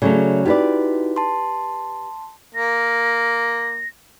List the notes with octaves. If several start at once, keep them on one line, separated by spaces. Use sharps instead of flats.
C#3 F#3 A3 D5
D#4 E4 F#4 G4 B4 D5
A5 C6
A#3 A#6